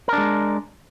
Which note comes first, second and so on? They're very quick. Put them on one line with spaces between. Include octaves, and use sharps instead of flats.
A#4 D4 G#3